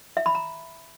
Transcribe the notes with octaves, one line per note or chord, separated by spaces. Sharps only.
E5
B5
A#5